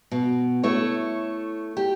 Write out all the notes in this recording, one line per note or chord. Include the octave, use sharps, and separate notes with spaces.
B2
A3 E4 C#5
G4